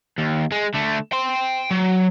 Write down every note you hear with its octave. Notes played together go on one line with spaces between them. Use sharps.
D#2
G#3
D3 A3
G5 C6
F#3